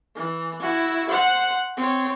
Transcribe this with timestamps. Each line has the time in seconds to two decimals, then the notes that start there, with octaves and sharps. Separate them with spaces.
0.16 E3
0.60 E4 F#4
1.09 C5 F#5
1.77 C4 C#5